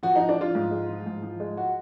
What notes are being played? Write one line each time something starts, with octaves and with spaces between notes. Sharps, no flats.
F3 F#4
F3 D#4
D4
F3 F4
G#2
G#3
F3
G#2
F3
G#3
F#4